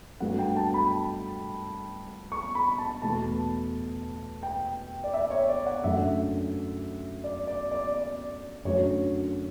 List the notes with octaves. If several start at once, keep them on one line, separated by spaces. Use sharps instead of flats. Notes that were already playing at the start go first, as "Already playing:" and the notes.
G2 F#3 A3 F#5
G5
A5
B5
C#6
B5
A5
E2 B2 A3 A5
G5
D5
E5
C#5
D5
F#5
F#2 D3 A3 E5
D5
D5
D5
D5
F#2 D3 F#3 A3 C#5